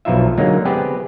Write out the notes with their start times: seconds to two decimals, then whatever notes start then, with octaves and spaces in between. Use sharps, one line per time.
0.05 B1 B2 F3 D#4 F4 E5
0.37 D3 F#3 G#3 A#3 D#4
0.65 B3 C4 G4 G#4 B4